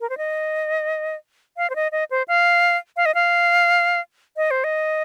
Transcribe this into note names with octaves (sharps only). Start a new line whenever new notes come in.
A#4
C5
D#5
F5
C5
D#5
D#5
C5
F5
F5
D#5
F5
D#5
C5
D#5